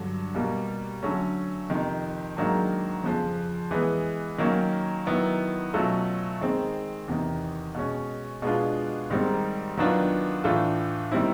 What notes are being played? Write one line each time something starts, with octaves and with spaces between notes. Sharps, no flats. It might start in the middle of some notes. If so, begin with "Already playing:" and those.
Already playing: G2 D3 F#3
B2 G3 A#3
D3 F#3 A3 C#4
F2 C3 D#3
G#2 D#3 F#3 A#3 D4
F2 C#3 F3
E3 G#3 B3
D#3 F#3 A#3 C#4
D#3 F#3 B3 E4
B2 F#3 A3 C#4 F4
D#3 G#3 C4
E2 C3 D#3
B2 G#3 C#4
B2 G#3 B3 D4 F4
G#2 D#3 G3 C4
D#3 F#3 B3 D4 F4
A2 E3 A3 D4 F4
D#3 G3 C4 E4